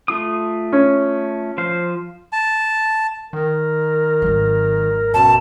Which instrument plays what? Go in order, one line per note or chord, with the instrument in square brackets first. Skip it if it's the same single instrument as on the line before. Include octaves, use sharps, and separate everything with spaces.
[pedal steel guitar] A3 F4 D#6
[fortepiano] C#4
[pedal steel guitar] F3 C5 F5
[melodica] A5
[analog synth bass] D#3 [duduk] A#4
[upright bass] G#1 F#3
[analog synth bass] F#2 [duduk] B2 [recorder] A5